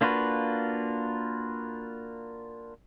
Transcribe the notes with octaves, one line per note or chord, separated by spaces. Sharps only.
A#3 D4 F4 F#4 B4